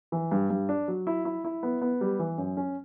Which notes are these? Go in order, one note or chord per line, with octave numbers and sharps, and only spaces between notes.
E3
G2
G2
D4
F#3
E4
E4
E4
B3
B3
G3
E3
F#2
C#4